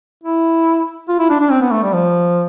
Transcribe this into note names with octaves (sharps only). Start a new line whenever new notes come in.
E4
F4
E4
D4
D4
C4
B3
A3
G3
F3